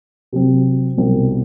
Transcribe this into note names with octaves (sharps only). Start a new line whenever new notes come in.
C3 F#3 C4
C2 B2 G3 C4 F#4